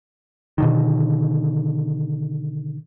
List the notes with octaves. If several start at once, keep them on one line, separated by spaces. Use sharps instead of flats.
B2 D3 D#3